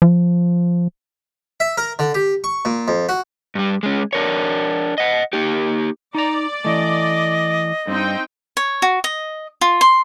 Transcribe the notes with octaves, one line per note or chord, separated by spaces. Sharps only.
F3
E5
A#4
D3
G4
C#6
A#2
F2
F#4
G2 G3
G#3 C#4
D4 A#4 C#5
D#5 F#5
A#3 D#4 G4
D#4 D5 A#5
E3 A3 D#5
G2 C4 D#4 G5
C#5
F#4
D#5
F4
C6